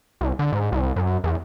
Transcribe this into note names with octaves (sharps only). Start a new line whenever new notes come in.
C2
D3
G#2
C2
F#2
E2